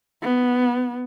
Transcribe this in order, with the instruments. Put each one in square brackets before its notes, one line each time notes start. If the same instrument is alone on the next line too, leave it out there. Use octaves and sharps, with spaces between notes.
[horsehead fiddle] B3